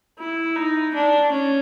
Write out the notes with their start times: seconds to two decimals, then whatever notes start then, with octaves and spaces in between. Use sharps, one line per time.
0.19 E4
0.56 D#4
0.95 D4
1.32 C#4